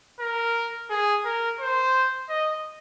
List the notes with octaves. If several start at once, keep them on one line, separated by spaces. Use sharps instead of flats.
A#4
G#4
A#4
C5
D#5